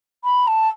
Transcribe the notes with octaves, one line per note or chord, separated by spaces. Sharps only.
B5
A5